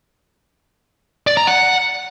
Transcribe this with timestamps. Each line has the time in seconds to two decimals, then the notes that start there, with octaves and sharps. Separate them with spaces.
1.27 D5
1.37 A#5
1.47 F#5